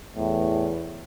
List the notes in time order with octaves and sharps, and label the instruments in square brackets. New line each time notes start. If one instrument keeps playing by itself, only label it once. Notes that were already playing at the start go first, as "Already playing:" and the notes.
[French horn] E2 [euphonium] A2